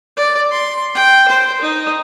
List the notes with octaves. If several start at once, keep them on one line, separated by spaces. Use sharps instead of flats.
D5
C6
G5
C5
D#4